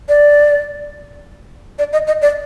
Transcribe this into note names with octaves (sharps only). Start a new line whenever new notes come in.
D5
D5
D#5
D#5
D5